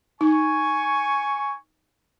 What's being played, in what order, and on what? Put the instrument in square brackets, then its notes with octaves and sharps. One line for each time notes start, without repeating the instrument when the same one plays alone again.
[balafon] D#4 [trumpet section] G#5 C#6